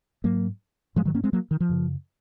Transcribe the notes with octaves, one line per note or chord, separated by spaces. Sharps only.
G#2 F#3 A#3
G#2 F3 G#3
D#3 F#3
A#3 C#4
G#3 C4
F#3 A#3
D#3
F3
F#2 C#3